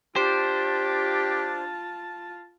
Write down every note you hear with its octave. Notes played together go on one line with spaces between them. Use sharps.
D4 F4 G4 C5 A5